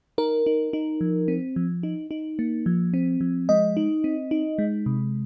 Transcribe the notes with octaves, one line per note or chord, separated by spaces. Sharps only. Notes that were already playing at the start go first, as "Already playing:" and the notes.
D#4 A#4
D#4
D#4
F3
C4
F3
D#4
D#4
A#3
F3
C4
F3
G#3 D#5
D#4
C4
D#4
G#3
C3